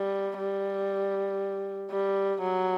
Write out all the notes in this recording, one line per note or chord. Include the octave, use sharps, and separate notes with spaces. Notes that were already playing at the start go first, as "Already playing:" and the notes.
Already playing: G3
G3
G3
F#3